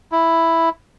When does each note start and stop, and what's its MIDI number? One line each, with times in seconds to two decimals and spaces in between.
0.12 0.69 64